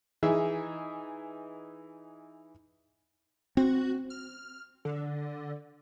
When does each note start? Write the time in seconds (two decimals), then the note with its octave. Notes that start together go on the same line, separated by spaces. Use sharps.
0.23 E3 D#4 G#4 E5
3.57 C4 F#4
4.10 F6
4.85 D3